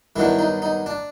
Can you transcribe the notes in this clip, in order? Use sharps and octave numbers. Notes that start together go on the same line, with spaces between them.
G2 D#3 F#3 B3 D4 E4
D#4
D#4
D4